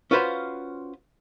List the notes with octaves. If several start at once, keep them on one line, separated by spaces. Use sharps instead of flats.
C#4 F4 F#4 B4 C5 F5